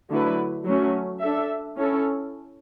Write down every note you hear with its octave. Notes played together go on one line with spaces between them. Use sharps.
D3 F#3 A3 E4 B4
F#3 A3 C#4 F#4
D4 A4 E5
C#4 E4 A4